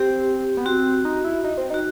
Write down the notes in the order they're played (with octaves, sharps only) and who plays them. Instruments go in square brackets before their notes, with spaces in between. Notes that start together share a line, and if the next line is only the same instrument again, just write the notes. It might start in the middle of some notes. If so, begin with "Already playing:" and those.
Already playing: [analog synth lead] C4 [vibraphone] G4
[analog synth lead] B3
[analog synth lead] C4 [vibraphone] F#4
[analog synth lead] D#4
E4
D#4
C4
[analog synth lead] D#4 [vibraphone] F#4